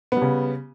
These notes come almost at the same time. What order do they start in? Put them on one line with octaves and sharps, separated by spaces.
B3 G3 C#3